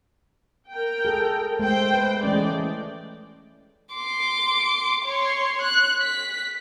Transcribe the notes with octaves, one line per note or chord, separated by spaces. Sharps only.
A#4 G5
G#4 A4
G#3 A3 C5 G5
B4
E3 G#3 A3 C#4 D5
C6 D6
C#5 C6
F#6
B6